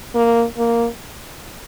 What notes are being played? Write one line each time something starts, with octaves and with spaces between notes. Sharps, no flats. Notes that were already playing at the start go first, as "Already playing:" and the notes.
A#3
A#3